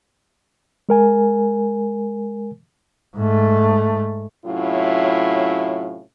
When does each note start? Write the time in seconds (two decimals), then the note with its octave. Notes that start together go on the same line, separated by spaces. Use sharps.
0.89 G#3 A#4 G#5
3.17 G#2 A3
4.46 A2 C3 F#3 C#4 E4 F4